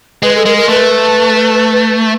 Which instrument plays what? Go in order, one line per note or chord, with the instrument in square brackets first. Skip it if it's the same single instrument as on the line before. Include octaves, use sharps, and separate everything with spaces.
[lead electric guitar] G#3 [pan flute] B4
[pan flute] A4
[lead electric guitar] G#3 [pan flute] A#4
[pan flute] A#4
[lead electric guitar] A3 [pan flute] B4